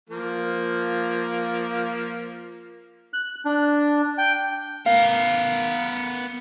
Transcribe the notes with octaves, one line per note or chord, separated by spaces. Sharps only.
F3 A#3
F#6
D4
G5
B3 A#4 F5